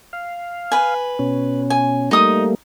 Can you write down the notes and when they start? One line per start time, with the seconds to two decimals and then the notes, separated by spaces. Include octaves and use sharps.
0.13 F5
0.72 B4 G#5
1.19 B2 C#4
1.70 G#5
2.11 G3 A3 A#3 D#4 D#6